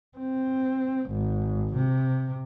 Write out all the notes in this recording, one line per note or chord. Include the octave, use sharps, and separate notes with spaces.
C4
G#1
C3